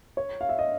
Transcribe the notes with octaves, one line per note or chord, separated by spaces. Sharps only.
C#5
F5
E5
D#5